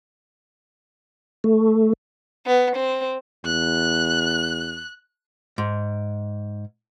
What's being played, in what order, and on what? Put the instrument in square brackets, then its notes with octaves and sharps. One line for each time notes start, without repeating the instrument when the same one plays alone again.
[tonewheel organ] A3
[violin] B3
C4
[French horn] E2 [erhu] F#6
[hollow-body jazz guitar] G#2